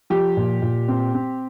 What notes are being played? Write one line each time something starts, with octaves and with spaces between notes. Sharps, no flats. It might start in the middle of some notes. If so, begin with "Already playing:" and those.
F3 G4
A#2
A#2
C4
C4